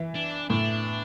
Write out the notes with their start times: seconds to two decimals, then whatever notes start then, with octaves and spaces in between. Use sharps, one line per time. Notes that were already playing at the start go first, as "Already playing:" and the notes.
Already playing: E3
0.15 D4
0.50 A2 D4